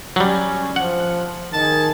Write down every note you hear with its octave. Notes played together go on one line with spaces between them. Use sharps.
F#3 G3 C#4
F3 F#5
D#3 G#4 A5